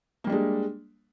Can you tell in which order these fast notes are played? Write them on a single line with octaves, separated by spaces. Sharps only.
A#3 G3 D4 G#3